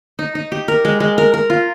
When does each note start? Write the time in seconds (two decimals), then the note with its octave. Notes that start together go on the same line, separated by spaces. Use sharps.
0.19 D#4
0.35 D#4
0.52 G4
0.68 A#4
0.85 G#3
1.00 G#3
1.18 A#4
1.34 A#4
1.50 F4